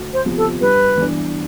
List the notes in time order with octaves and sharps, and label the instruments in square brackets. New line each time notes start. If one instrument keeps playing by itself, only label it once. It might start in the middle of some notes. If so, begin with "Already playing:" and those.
Already playing: [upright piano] D2
[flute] C5
[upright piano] C3 F3 B3
[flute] A4
[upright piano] G2 [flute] B4
[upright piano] E3 B3 D4